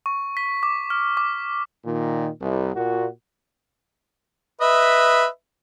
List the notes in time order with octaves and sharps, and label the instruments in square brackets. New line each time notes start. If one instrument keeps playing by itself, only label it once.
[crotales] C#6
B6
D6
F6
D6
[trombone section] A#2 D#3
C2
A#2 F#4
[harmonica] B4 D#5 E5